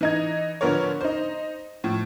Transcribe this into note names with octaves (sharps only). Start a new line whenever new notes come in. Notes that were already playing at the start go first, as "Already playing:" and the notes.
E3 D#4 G#6
D3 F3 B3 A#4 C#5
D#4 C5
A2 F3